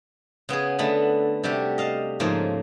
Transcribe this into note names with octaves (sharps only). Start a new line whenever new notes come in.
C#3 B3 F#4 G#4
D3 A3 B3 B4 B5
C3 G3 A3 F#4 G4
D#5 F5 A5
G#2 C#3 F3 A3 A#3